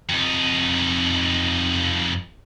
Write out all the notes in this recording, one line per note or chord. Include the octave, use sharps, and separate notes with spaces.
F2 D#4